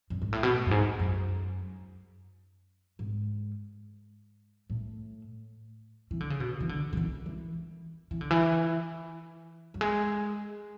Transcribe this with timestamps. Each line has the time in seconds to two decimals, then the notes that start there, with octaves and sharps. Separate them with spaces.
0.10 F#2
0.22 G#2
0.32 A2
0.43 B2
0.66 F#2
0.71 G#2
1.00 F#2
2.99 G#2
4.70 A2
6.11 E3
6.20 D3
6.30 C#3
6.40 B2
6.61 E3
6.69 D3
6.93 D3
6.97 E3
7.26 E3
8.11 E3
8.21 D3
8.31 E3
9.74 F#3
9.81 G#3